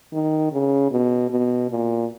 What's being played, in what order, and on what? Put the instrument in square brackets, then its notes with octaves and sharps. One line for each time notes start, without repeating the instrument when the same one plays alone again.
[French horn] D#3
C#3
B2
B2
A#2